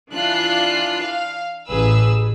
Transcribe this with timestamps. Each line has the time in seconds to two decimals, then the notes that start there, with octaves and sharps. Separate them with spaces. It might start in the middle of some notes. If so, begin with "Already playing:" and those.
0.12 E3 D4 F4 F#6 C7
1.00 F5
1.66 A1 G#4 B4 E6